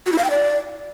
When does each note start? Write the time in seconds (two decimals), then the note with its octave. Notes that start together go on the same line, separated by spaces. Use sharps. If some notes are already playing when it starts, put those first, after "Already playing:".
0.06 F#4
0.12 E4
0.18 F5
0.24 G5
0.30 D5